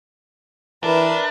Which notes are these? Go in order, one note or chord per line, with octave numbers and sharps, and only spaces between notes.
E3 D4 A#4 B4 E5